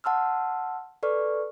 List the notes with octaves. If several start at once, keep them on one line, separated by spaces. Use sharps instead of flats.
F#5 A5 C6 E6 F6
A4 B4 D5 C#6 F6